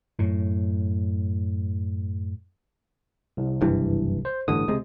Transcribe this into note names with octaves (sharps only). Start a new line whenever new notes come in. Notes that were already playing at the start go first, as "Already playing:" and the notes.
F#2 A2
C2
F#1 G2 E3
C5
A1 G2 D3 D#6
C#2 C3 G#3